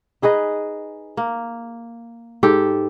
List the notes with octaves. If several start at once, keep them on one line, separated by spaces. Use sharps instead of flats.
D#4 G#4 B4 D#5
A#3
G#2 G4 A4